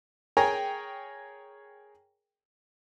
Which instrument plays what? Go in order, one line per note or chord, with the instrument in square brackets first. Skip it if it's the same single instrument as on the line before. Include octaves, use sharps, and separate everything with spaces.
[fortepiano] G#4 A#4 C#5 G5 G#5 A#5